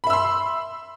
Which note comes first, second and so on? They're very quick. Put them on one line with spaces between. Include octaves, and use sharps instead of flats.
B5 E5 E6 C6